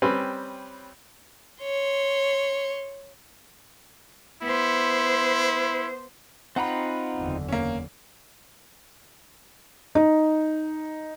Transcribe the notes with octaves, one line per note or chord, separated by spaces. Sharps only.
G3 C4 C#4 B4
C#5 C6
B3 E4 C5
C4 D#4 F4 F#5 A#5 B5
F#1 E2 D3
A#3 C#4
D#4